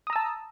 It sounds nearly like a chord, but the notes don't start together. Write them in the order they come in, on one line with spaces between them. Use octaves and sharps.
D#6 A#5 E6 A5